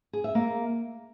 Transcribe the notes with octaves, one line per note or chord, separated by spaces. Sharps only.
G#4
E5
A#3